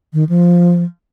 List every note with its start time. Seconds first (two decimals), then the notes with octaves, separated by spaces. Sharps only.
0.13 D#3
0.29 F3